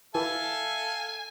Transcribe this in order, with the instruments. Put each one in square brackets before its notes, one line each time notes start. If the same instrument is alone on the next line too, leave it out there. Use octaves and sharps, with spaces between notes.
[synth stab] E3 [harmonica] A4 F5 A5 [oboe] E5 [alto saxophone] G#5